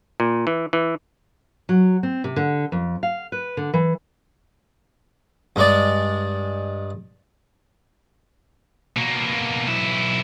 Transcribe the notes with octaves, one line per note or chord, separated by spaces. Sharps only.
A#2
E3
E3
F#3
C4
C3
D3
F2
F5
B4
D3
E3
G2 G#3 D5
B2 A#3
B1 E4